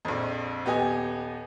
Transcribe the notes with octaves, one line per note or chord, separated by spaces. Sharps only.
A#1 F2
D#1 B3 G4 D#5 G#5